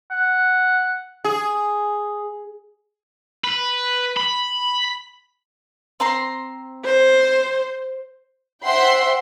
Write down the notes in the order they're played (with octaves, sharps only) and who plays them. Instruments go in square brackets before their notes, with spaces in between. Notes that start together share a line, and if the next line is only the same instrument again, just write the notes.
[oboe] F#5
[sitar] G#4
[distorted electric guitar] B4
B5
[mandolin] C4 A#5 C6
[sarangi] C5
[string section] C5 E5 F#5 G5 C6